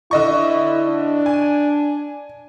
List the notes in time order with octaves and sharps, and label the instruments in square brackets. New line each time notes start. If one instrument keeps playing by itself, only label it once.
[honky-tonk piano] D3 D#5 C#6 [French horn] E4
[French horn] D4
[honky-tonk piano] G#5